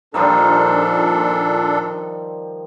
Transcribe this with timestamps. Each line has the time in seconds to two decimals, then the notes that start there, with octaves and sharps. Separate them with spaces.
0.14 A#2 D#3 F3 G3 D4 A4